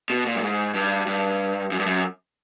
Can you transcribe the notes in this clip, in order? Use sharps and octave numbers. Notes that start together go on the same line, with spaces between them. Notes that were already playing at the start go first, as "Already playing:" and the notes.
B2
A#2
G2
G#2
G2
G2
F#2
G2
F#2